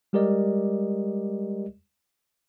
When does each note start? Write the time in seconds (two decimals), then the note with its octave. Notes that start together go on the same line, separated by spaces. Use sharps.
0.13 G3 G#3 G4 A#4 D5 D#5